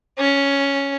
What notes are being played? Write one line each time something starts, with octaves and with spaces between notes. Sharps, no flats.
C#4